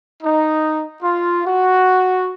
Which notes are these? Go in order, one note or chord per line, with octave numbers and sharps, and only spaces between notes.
D#4
F4
F#4